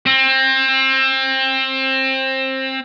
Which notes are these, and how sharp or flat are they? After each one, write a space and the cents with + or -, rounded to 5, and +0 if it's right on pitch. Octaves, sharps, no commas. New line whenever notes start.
C4 +25